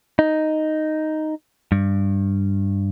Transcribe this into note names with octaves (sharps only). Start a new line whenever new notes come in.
D#4
G2